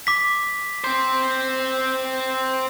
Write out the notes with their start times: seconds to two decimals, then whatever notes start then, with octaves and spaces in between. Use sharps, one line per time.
0.07 D6 B6
0.84 C4 C5